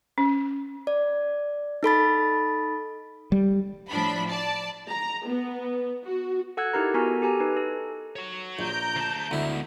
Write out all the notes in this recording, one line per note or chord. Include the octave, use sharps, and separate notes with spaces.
C#4
D5
D#4 A4 B5 A6
G3
A2 F3 D4 B5
D5 A5
A#5
B3
F#4
A4 F#5 E6 F#6 G#6
D#4 E4 G4 A#4 A#5
B3 F#4 A4 A#4 G#5 A#5
G4 A4 G#5 A#5
D#4 B4
A4
F#4 C#5
A#1 A#5 G6 D7
D2 A5
D2 G#3 B3 E4